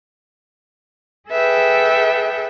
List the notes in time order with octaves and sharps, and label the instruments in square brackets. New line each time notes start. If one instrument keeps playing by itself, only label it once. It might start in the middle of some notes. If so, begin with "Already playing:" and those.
[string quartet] G#4 A4 B4 E5 G5